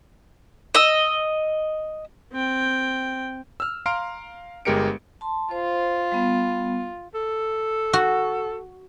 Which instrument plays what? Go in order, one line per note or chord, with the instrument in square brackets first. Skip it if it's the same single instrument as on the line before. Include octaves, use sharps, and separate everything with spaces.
[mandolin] D#5 E6
[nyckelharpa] C4 G5
[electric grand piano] E6 F6
F5 A#5 C6 F6 D7
G1 G#3 G4 A#4 C#7 D7
[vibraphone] A5 C6
[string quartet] F4 [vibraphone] C5
[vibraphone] G3 B3
[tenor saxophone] A4
[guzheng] F#4